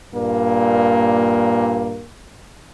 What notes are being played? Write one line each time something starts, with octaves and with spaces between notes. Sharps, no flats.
G2 A#2 A#3